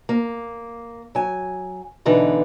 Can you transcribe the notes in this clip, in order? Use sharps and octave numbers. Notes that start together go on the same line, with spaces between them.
A#3
F#3 G#5
B2 D3 E3 D#4 B4